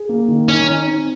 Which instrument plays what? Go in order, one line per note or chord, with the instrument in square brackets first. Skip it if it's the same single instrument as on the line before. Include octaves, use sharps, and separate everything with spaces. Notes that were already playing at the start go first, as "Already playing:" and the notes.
Already playing: [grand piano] G#4
A#3
D#3
[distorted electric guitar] C#4 [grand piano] D#4
[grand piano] D#4
C4